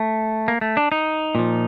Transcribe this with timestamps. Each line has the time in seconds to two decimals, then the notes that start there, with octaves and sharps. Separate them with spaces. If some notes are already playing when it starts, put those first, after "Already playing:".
Already playing: A3
0.48 A#3
0.61 A3
0.77 D4
0.92 D#4
1.35 A#2 F3